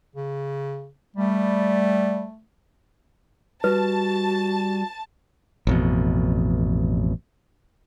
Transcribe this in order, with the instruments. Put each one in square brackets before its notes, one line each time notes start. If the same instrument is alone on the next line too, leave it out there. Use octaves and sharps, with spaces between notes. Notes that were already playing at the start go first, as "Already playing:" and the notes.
[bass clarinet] C#3
[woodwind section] G3 [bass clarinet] A3
[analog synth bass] G3 [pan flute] F#4 [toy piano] B4 [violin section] A5
[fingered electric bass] A1 F2 B2